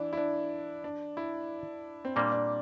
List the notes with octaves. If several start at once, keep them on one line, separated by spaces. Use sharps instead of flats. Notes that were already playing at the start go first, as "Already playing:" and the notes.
Already playing: E3 D4 E4
E4
D4
D4
E4
C4
A#2 G3 A#3 D4
D4